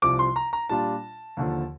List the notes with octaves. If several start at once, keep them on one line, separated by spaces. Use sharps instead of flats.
C2 C3 F3 D6
C6
A#5
A#5
A#2 G3 D4 F4 A5
D#2 D3 F3